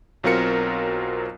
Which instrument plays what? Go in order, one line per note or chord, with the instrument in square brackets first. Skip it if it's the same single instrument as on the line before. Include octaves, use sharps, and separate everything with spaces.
[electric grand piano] B1 F#3 C4 F4 A#4 C#7